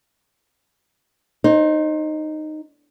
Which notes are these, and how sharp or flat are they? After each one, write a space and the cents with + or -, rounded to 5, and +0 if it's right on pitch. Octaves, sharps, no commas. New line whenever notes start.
D#4 -10 C5 +30